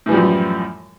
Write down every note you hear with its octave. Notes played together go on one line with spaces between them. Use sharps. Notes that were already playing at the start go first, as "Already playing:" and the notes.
F#2 A2 E3 F3 G3